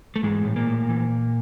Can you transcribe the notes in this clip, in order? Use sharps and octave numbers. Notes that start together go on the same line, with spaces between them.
A3
G#2 E3 G#3
A2
A#2 A#3
A2
E3